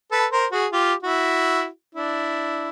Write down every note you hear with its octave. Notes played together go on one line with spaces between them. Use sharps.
A4 B4
A#4 C5
F#4 G#4
F4 G4
E4 F#4
D4 E4